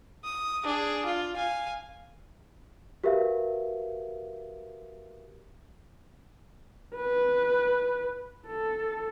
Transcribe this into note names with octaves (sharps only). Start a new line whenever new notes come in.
D#6
D4 G#4
F4
F5 G#5
F#4 G4 A#4 B4 E5 F5
B4
A4